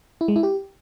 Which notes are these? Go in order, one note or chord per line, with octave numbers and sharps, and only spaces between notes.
E4
G#3
E4
G4